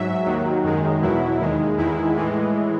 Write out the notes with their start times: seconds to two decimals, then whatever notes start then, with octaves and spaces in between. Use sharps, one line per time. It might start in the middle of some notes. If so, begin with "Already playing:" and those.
Already playing: G#2 F#3 E5
0.26 D#2 D#3 F#3
0.64 F#2 D#3 G#3
1.02 E2 B2 F#3 E4
1.40 D#2 D#3 G#3
1.78 E2 D#3 G#3 E4
2.16 A2 E3 G#3